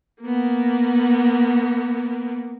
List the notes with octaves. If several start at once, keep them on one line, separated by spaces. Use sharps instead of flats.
A#3 B3